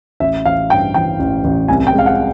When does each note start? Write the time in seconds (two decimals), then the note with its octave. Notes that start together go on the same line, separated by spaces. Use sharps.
0.20 A1 E5
0.45 A1 F5
0.70 G2 G5
0.94 E3 G5
1.19 A1
1.44 A1
1.68 C2 G#5
1.87 G5
1.93 G#3
1.99 F5
2.06 F#5